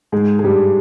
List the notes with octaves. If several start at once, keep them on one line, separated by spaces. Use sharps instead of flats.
G#2 G#3
G#3
G2 G3